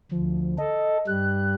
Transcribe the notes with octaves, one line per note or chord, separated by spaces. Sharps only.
D2 F3
A4 D#5
G2 G3 F#6